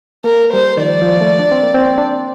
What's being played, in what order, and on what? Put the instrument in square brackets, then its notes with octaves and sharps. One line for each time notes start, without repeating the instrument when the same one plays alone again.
[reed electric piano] A#3 [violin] A#4
[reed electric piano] G3 [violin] C5
[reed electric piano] D#3
[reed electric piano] F3 [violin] D5
[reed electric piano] F3
A3
D4
C4
A#3
C4
D4